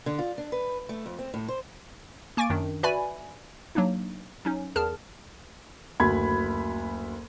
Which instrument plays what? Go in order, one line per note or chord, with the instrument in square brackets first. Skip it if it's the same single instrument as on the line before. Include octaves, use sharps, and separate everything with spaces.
[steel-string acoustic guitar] D3
F4
D4
B4
A3
F2
C4
A2
C5
[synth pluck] A#3 G#5 C#6 D6 A6 D7
F#2 D#3 D4
F#4 B4 D5 E5 G#5 B5
F#3 A#3 D4 D#4
F#3 C#4 D#4
E2 G#4 A#4 A5 F6
[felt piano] F#1 D2 F#4 B5 G#6